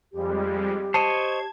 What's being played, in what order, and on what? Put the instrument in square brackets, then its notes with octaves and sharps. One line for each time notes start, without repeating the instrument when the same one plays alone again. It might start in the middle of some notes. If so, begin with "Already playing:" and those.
[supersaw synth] F2 G3 G#3 [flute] G4
[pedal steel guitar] C5 C#5 D#5 [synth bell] A5 [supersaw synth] G#6